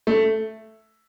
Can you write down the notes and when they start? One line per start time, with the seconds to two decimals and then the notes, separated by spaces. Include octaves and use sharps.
0.07 A3